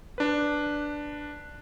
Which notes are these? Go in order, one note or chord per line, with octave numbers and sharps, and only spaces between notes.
D4 B4